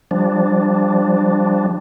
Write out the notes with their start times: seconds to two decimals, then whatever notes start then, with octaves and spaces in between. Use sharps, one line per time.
0.11 F3 G3 D4